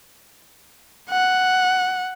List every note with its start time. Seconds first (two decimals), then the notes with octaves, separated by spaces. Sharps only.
1.10 F#5